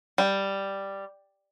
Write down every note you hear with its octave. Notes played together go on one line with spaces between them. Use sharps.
G3